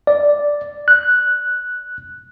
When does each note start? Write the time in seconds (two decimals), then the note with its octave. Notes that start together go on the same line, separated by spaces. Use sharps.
0.07 D5
0.88 F#6